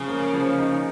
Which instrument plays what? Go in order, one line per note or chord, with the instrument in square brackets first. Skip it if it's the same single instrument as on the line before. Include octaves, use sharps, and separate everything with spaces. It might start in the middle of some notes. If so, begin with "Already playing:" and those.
Already playing: [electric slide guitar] C#3 [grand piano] F3
[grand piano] A#3
F3
D#4